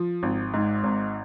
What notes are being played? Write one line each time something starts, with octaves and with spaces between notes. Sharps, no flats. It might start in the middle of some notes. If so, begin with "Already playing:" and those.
Already playing: F3
G#1
G#2
G#1